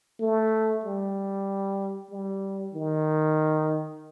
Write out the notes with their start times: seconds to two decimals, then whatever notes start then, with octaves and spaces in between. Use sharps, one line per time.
0.21 A3
0.84 G3
2.11 G3
2.74 D#3